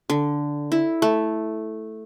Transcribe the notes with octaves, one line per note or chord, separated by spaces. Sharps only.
D3
E4
A3